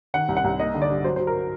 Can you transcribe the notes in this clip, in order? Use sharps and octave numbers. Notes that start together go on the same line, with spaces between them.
D#3 F#5
C2
F#5
C2
A#3 D#5
D3
D5
G2
F#3 C5
F#3 C5
A#4